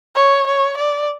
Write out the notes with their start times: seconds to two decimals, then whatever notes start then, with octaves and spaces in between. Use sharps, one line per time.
0.16 C#5
0.47 C#5
0.77 D5